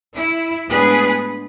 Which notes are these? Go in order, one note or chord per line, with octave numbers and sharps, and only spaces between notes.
E4
A2 G#3 B3 D4 G#4 B4